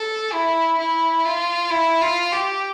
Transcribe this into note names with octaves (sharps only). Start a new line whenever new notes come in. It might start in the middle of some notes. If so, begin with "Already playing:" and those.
Already playing: A4
E4
E4
F4
E4
F4
G4